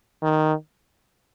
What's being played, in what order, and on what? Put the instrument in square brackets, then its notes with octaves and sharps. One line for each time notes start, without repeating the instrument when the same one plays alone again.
[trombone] D#3